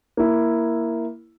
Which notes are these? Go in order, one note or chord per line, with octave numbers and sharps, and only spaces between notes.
A#3 E4